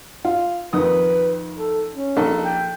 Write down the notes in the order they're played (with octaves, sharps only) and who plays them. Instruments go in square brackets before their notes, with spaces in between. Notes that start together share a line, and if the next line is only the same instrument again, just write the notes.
[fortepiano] F4
[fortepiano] F2 D#3 D#6 [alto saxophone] B4
[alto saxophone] A4
C#4
[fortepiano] A#1 D#4 A4
[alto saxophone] G5